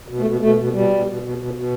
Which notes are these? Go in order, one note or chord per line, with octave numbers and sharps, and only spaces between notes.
B2
A3
B2
B2 A3
B2
B2 G3
B2
B2
B2
B2
B2